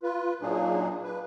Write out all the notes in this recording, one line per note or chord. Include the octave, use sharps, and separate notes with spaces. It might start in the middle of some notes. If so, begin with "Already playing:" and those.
F4 B4
A#2 F#3 A#3 D4 D#4 G#4
B4